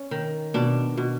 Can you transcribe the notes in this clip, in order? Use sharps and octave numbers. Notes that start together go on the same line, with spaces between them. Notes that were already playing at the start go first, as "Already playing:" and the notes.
Already playing: C#4
D#3
B2 D4
B2